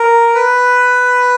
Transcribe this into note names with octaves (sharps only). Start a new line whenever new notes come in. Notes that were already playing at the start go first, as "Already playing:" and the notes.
Already playing: A#4
B4